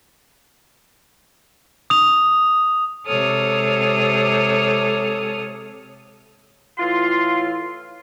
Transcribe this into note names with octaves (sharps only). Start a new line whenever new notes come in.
D#6 F7
C3 G#3 A4 C#5 D#6 F6
A2 E3 F4 C6